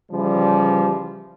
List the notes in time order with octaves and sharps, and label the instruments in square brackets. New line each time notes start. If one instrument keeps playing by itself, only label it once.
[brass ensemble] C#3 E3 F3 G3